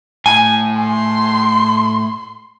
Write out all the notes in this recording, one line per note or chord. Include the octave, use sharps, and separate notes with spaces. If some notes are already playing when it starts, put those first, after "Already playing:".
A2 G#5
C6